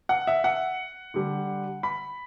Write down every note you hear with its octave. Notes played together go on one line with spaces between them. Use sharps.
F#5
E5
F#5
D3 G3
B5